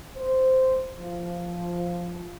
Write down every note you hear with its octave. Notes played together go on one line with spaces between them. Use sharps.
C5
F3